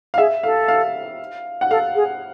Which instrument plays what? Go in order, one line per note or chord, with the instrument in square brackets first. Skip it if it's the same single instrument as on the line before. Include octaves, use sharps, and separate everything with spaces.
[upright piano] F5
[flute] G#4 [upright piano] E5
[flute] A4 [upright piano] F5
[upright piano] F5
F#5
[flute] A4 [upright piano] F5
[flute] G#4